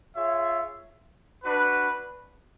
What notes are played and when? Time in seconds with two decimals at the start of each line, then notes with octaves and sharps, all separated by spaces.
0.16 F4 G#4 C#5 E5
1.44 D4 F#4 B4